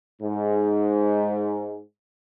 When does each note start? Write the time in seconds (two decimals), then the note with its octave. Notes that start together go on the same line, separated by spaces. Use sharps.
0.22 G#2